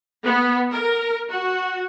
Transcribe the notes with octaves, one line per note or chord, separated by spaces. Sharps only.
B3
A#4
F#4